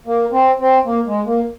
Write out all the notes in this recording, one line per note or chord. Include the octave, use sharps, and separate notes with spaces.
A#3
C4
C4
A#3
G#3
A#3